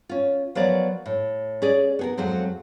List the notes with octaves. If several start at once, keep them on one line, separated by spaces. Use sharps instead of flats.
C#4 F4
F3 F#3 B3 A#4 D5
A2
C#4 G#4 D5
B3 G#4 A#4
F2 F#3 G#3 C4